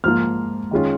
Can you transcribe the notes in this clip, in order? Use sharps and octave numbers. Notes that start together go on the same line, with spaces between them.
G#2 F3 A#3 F4 F6
D#3 G#3 C#4 F4